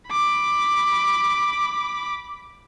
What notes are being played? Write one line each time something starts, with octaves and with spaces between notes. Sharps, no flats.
B5 D6